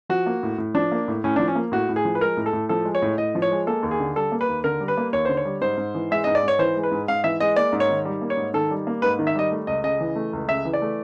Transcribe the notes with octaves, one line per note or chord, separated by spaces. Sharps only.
F3 F#4
A#3
A2
A2
F3 D4
A#3
A2
A2 C#4
D4
F3
C#4
A#3
A2 F#4
A2
G#4
F3
B4
G#3 A#4
A2
A4
A2
F3 A4
G#3
C#5
A2
A2 D#5
F3
C#5
G#3
A#3 A4
D#2
G#4
D3
G3 A4
A#3
B4
D#2
D3 A#4
G3
B4
A#3
D#2 C#5
D3 C5
C#5
G3
G#2 C5
G#2
E3
G#3 E5
G#2 D#5
D5
G#2 C#5
E3 C5
G#3
B4
G#2
G#2 F5
E3 E5
G#3 D#5
A#3 D5
G#2
C#5
D#3
G3
A#3
C#5
G#2
D#3 A4
G3
A#3
G#2 B4
D#3
E5
G3 D#5
A3
C#2 D#5
C#3 D#5
E3
A3
C#2
C#3 E5
E3
D5
A3